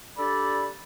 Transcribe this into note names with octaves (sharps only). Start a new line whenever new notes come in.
D4 G4 A4 D5 A5 B5